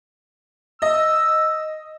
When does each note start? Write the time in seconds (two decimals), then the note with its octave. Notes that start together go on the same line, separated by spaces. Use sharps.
0.82 D#5 E6